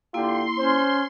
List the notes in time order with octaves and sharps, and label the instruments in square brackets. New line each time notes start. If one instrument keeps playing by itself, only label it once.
[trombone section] D3 F4 G4 [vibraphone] A#3 E4 [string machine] C6
[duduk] C#4 [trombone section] C5